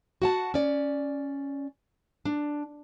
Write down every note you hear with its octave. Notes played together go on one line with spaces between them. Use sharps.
F#4 F#5 A5
C#4 D5
D4